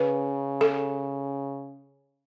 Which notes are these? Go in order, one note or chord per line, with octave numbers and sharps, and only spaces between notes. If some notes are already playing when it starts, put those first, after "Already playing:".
Already playing: C#3 B4
A4